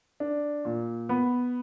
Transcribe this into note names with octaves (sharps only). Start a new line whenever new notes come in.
D4
A#2
B3